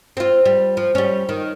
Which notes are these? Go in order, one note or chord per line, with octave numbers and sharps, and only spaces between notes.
C4 F4
G3
F3
G3 C#4
D#3